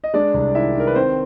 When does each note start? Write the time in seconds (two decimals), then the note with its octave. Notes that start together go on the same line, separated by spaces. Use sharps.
0.04 D#5
0.14 G#3 D4 D5
0.34 C2
0.54 D#3 E4 E5
0.75 D#3 A#4
0.87 B4
0.95 D#3 C4 C5